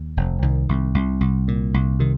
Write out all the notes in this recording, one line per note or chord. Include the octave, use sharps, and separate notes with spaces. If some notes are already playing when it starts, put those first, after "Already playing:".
Already playing: D#2
F1
C2 D#3
C2
C2
C2
A#2
C2
C3 D#3